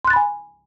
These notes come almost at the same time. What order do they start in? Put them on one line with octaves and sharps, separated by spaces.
C6 F#6 A6 B5 G#5